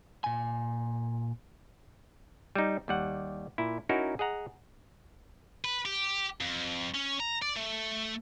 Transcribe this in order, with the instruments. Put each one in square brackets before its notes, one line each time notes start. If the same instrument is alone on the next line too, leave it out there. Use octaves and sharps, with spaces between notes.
[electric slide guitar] A#2 G#5
[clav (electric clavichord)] G3 D#4
D#2 G3 F#5
A#2 E4
C#4 D#4 E4 F#4 A#4
G#4 D#5 F#5 A#5
[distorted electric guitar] B4
G4
F2
C#4
A#5
D5
A3